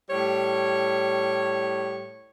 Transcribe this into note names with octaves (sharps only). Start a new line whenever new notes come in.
A2 G3 C#5